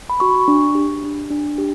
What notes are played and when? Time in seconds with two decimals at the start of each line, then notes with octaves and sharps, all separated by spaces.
0.10 B5
0.20 F#4 C#6
0.48 D4
0.75 G4
1.04 D4
1.31 D4
1.58 G4